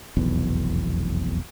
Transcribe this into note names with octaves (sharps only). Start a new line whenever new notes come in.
F1 B1 E2